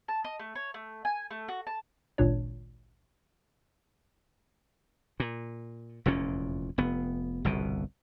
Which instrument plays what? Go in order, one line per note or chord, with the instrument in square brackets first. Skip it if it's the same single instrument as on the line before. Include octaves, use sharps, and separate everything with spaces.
[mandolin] A5
D#5
A3
C#5
A3
G#5
A3
F#4
A5
[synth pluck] G#1 C#2 A#2 D4 C#5
[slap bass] A#2
F1 E2 A#2 C#4
F1 B3
G1 C2 B2